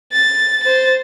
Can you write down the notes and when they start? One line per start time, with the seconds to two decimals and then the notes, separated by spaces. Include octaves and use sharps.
0.13 A6
0.63 C5 A6